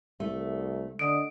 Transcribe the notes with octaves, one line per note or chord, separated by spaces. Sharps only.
C2 A3
D3 D#5 D#6 D7